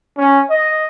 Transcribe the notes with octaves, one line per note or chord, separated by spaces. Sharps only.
C#4
D#5